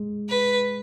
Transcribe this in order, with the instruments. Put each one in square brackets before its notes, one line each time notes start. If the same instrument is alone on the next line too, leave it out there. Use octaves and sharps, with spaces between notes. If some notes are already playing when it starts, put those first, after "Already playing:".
Already playing: [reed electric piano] G#3
[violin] B4